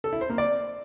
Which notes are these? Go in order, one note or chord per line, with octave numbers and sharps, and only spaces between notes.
A4
E4
C5
A#3
D5